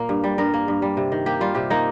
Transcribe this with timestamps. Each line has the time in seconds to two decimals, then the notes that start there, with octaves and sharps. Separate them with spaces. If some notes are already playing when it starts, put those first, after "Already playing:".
Already playing: A#2 A#3
0.09 G2
0.24 G3
0.38 G2 A#4
0.54 A#3
0.68 G2
0.82 G3
0.97 C3
1.12 D#3
1.26 A#3 G4
1.40 G3 F4
1.55 C3 G4
1.70 A#3 D#4